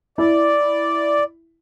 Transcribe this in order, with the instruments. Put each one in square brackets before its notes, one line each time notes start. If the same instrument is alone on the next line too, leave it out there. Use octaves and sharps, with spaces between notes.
[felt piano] E4 [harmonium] D5